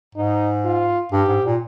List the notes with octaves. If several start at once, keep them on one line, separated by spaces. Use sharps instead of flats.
G#2 D#4
F4
G2 G4
G#2
A#2